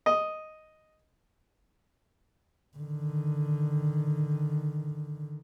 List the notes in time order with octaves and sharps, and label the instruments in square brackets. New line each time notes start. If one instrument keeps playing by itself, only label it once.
[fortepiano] D#5
[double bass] D3 D#3